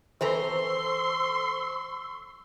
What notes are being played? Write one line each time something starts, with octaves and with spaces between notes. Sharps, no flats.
E3 C4 A4 C5 A#5 C6 C#6 E6